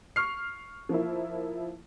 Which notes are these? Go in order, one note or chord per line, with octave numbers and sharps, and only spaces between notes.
C#6 F6 C7
F3 A#3 E4